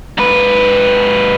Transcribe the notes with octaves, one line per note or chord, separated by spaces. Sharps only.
G#2 B4